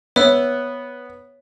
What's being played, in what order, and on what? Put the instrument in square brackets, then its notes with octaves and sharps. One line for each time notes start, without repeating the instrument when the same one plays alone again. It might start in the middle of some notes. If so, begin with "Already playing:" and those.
[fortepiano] B3 [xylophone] C#5 E5 E6